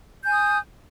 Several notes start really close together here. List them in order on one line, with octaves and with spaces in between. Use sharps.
G6 G#5 D#6